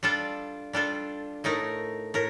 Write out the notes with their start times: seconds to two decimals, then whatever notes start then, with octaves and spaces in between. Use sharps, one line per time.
0.03 G3 D4 F4 A4
0.73 G3 D4 F4 A4
1.44 A2 A3 D#4 A#4
2.14 A2 A#4